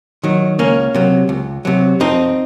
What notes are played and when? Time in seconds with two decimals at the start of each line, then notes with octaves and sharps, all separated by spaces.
0.23 D#3 F#3
0.59 C#2 A#3 C#4
0.94 C3 F#3
1.29 C#2
1.65 C3 F#3
2.00 F2 C4 D#4